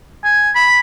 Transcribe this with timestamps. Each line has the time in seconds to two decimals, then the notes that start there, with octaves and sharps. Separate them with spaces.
0.24 G#5
0.55 B5